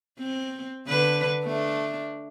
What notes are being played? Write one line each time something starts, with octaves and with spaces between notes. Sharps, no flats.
C4
D3 B4
A3 D4